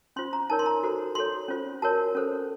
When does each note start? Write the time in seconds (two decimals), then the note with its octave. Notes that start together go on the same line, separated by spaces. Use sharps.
0.16 C#4 F4 C5 C6
0.33 A#5
0.50 D#4 A#4 C#5 A5
0.59 C6
0.66 A#5
0.83 F#4 A4 C5
1.15 F#4 A4 C#5 C6
1.48 C#4 F4 C5
1.82 F#4 A#4 C#5 A5
2.15 C#4 A4 C5